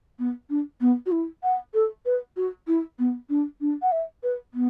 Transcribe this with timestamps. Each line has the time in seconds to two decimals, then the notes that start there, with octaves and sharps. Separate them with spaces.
0.19 B3
0.50 D4
0.81 B3
1.06 F#4
1.12 E4
1.43 F#5
1.74 A4
2.05 B4
2.36 F#4
2.67 E4
2.99 B3
3.29 D4
3.61 D4
3.82 F#5
3.92 E5
4.23 B4
4.54 B3